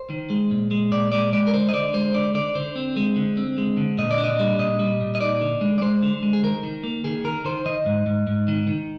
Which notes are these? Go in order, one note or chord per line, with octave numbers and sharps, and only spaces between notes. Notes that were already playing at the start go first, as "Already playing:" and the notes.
Already playing: C5
D#3
G#3
A#2
G#3
A#2 D5
G#3 D5
G#3 D5
A#4
D3 C5
D#5
D3 D5
G#3 C5
D3 D5
D3 D5
D3 C5
C4
G#3
D3
C4
G#3
D3
A#2 D#5
D5
D4
D#5
G3
A#2 D#5
G3
A#2
D#5
D#4 D5
D3
G#3
D5
G#3 C5
D3
G#3
G#4
D#3 A#4
D#3
A#3
D#3 G#4
D#3 A#4
D#3 C5
D#3 D#5
G#2
G#2
G#2
D#3
D#3